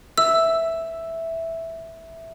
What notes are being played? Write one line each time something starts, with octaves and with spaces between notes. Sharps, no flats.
E5 E6